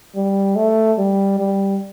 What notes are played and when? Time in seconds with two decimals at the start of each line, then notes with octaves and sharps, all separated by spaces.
0.15 G3
0.56 A3
0.98 G3
1.39 G3